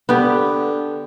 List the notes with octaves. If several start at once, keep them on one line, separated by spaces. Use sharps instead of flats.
D3 B3 G4